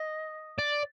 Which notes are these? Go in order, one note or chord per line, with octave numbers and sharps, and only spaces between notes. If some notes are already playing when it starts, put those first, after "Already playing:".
Already playing: D#5
D5